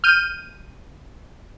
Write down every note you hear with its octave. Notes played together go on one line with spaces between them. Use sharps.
F6 G6 D#7